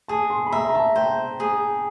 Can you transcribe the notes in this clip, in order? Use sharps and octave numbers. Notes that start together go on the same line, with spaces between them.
G#4 A5
C6
B5
E5 A#5
A#5
A5
C5 G5
G#4